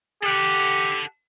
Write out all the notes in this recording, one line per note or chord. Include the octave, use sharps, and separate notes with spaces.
G4 A4 F#5